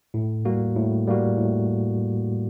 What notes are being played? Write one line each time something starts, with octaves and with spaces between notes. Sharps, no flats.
A2
G3 A#3 F#4
A2
G3 A#3 F#4
A2